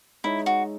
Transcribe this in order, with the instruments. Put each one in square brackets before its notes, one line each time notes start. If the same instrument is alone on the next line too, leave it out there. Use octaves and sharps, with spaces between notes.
[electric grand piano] G#3 D#4 G#4 C#5 E5 [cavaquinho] E4
[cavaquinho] F#4